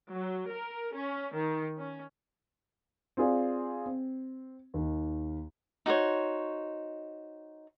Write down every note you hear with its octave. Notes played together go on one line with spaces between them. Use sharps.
F#3
A#4
C#4
D#3
C#4
C4 F4 G#4 D5
C4
D#2 D#3
D#4 F#4 C5 C#5